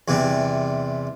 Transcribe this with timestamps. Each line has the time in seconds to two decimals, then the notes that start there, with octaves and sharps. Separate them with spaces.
0.08 E2 C3 G3